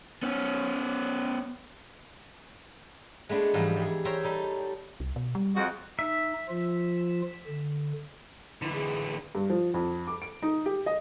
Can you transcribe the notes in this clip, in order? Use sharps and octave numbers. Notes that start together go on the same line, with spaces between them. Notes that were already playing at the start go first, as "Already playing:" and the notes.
B3 C#4
G#3 A3 B3 D4
G#2 E3 F3 G3 G#3
G3 G#4
A#4 C5 C#5 E5 G5 A#5
G3 D#4 A4
C2
B2
G3
F2 G#3 F#4
D#4 E5
F3 F4
D3
D3 E3 E4
G#4
G2
F3
F2
D6
D7
D#4
G4
D#5